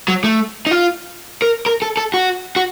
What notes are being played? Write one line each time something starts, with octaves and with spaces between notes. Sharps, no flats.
F#3
A3
D#4
F4
A#4
A#4
A4
A4
F#4
F#4